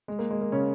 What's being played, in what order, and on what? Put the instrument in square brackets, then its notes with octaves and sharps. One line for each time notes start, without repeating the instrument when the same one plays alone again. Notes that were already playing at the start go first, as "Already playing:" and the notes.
[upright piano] G#3
A#3
G#3
A#3
C#3 C#4